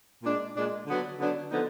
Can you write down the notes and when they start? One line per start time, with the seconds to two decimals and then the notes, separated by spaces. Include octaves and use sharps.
0.23 A#2 G#3 D4
0.55 A#2 G#3 D4
0.86 D3 F#3 B3 D4
1.19 D3 F#3 B3 D4
1.51 D3 F3 B3 D#4